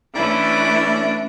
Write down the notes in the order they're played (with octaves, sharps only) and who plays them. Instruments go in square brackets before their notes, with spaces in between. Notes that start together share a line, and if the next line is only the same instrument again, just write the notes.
[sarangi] E3 [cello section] A3 C#4 [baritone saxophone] D4 [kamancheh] E4 B4